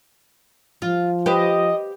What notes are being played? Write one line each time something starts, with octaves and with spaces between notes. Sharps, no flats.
F3 F4
G4 B4 C5 D#5